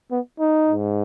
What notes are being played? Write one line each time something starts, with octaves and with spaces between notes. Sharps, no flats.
B3
D#4
G#2